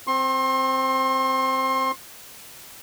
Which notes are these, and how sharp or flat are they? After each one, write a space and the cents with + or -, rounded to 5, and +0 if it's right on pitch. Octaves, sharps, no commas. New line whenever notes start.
C4 +0 C6 +35